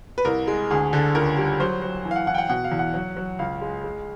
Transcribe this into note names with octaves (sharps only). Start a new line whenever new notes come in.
B4
C2 A#4
G#3
D2 G#4
D3 A4
C#2 A#4
G3
F#3 C5
F#3
E3
F5
F#5
E3 F#5
G5
F#5
B2 F#5
F5
E2
F#5
F#3
F#3
C#2 F5
G#3
G#3